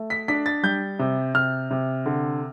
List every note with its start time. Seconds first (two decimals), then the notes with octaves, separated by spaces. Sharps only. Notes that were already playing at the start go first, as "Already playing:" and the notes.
Already playing: A3
0.10 B6
0.28 D4 B6
0.46 A6
0.63 G3 G6
0.99 C3
1.34 C3 F6
1.71 C3
2.06 D3